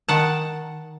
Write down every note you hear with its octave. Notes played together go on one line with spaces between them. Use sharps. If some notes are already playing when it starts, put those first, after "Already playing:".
D#3 F#5 A5